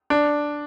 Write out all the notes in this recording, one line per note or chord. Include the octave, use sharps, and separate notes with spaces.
D4